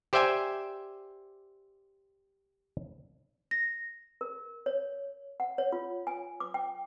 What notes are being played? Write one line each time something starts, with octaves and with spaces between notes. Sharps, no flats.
G4 C5 D5 E5 G5 G#5
A#6
A#4
C#5
F#5
C#5
F4
G#5
D6
G5